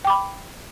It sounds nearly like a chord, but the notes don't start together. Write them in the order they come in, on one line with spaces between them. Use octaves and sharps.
G5 D6 B5